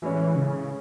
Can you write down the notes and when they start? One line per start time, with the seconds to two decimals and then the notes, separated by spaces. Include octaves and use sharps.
0.02 A2 E3 G#3 C#4 G#4 C#5
0.35 C#3